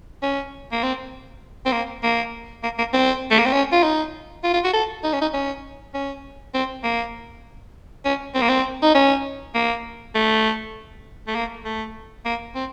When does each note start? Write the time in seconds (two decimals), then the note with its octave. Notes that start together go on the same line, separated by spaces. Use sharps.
0.22 C#4
0.72 A#3
0.83 C4
1.66 C4
1.73 A#3
2.03 A#3
2.63 A#3
2.78 A#3
2.93 C4
3.31 A3
3.39 A#3
3.46 C4
3.53 C#4
3.72 F4
3.83 D#4
4.44 F4
4.54 F4
4.64 F#4
4.74 A4
5.04 D#4
5.13 C#4
5.22 D#4
5.34 C#4
5.94 C#4
6.54 C4
6.84 A#3
8.05 C#4
8.35 C4
8.42 A#3
8.49 C4
8.82 D#4
8.95 C#4
9.55 A#3
10.15 A3
11.27 A3
11.35 A#3
11.65 A3
12.25 A#3
12.55 C4